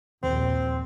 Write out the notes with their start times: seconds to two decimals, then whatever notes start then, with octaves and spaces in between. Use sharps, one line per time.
0.24 A#1 D#2 C4